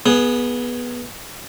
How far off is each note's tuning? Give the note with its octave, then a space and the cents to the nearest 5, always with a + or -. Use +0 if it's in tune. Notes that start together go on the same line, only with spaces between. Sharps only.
B3 -15 G#4 +10